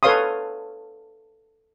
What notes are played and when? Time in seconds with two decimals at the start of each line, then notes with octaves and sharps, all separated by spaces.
0.03 A4 B4 C#5 F5 C6 D#6